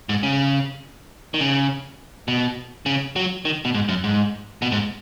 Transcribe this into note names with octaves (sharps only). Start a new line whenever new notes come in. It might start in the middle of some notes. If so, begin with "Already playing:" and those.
G#2
C#3
D#3
C#3
B2
C#3
F#3
D#3
B2
G#2
F#2
G#2
B2
G#2